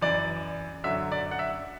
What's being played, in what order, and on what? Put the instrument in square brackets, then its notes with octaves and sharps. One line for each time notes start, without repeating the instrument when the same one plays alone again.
[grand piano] F#2 E3 D5
F#2 D3 F#3 E5
D5
F#5
E5